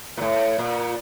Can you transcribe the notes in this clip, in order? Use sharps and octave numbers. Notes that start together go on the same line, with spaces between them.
A#2
A2
A#2